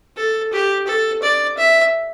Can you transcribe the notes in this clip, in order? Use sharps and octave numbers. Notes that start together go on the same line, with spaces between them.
A4
G4
A4
D5
E5